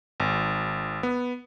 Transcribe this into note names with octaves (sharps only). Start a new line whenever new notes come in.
G#1
B3